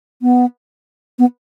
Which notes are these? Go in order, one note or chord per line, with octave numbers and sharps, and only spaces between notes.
B3
B3